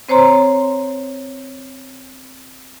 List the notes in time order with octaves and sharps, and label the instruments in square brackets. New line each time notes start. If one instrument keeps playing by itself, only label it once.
[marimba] C4 C5 C#5 A#5 C6